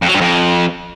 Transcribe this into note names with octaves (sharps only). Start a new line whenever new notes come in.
F2
F#3
G2
F2